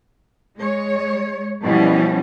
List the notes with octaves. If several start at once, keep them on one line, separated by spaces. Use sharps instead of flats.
G#3 C#5
B2 E3 F3 G3 C#4